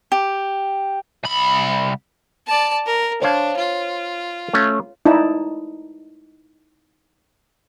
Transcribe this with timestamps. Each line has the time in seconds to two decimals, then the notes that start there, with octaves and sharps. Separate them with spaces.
0.12 G4
1.23 C2 B5
2.47 D5 A5
2.86 A#4
3.22 D4 C5 C#5 F5
3.57 F4
4.53 A3 C#4
5.06 D#4 E4 D5 A5